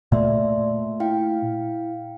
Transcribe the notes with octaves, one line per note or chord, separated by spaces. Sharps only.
A#2 A3 D5 E5 C6
E4 F5 G5